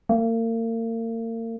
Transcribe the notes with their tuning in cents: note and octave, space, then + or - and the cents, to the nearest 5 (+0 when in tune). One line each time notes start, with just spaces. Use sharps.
A#3 -40